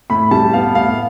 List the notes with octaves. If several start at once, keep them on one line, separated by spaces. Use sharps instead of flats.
A2 B5
G3 A5
B3 F5
A2 F5